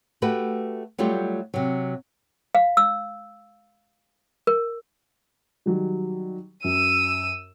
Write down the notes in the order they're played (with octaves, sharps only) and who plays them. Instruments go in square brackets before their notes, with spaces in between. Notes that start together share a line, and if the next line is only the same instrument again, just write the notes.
[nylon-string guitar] A3 F#4 G4 B4
F#3 G3 A3 F4 G4
C3 F#3
[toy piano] F5
E6
A#4
[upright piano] D#3 F#3 G3
[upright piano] F#2 [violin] E6 D#7